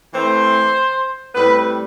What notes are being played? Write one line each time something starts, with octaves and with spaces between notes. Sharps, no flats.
E3 A3 C4 C5
A2 G3 C4 B4